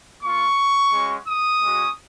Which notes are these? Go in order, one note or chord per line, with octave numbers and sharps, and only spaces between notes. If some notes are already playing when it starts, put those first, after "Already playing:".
A#3 F4 C#6
G#3 C#4 F#4
D#6
G#3 C#4 F#4